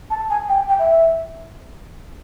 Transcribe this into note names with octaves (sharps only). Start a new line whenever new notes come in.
A5
G#5
G5
G5
E5